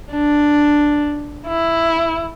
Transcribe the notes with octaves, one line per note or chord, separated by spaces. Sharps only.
D4
E4